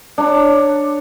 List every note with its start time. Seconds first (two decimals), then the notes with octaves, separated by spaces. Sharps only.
0.18 D4 C#5 A#5